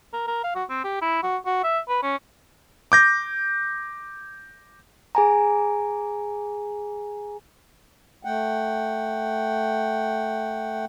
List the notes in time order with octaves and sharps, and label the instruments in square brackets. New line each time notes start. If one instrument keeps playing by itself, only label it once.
[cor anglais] A#4
A#4
F5
F#4
C4
G4
E4
F#4
F#4
E5
B4
C#4
[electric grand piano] D6 G6 A#6
[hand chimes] G#4 G#5 A#5
[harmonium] A3 F#5 G5